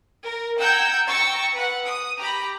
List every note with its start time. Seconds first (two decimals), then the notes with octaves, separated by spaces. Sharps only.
0.25 A#4
0.58 F#5 G5 A#5 E6 G6 G#6
1.07 G5 A#5 C#6 E6 A6
1.53 B4 F#5
1.83 D#6
2.18 G4 A#5 B5